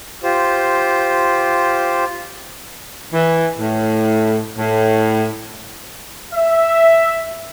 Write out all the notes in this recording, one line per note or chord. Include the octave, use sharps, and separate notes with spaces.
F4 G4 C5
E3
A2
A2
E5